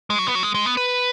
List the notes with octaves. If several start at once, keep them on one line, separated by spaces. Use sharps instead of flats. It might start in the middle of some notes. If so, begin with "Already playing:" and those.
G#3
F#3
B3
F#3
G#3
G#3
B3
B4